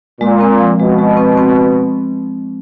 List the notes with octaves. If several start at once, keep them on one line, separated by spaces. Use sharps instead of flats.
A#2 G#3
C4
F3
B2 G#3
G#3
C4
C4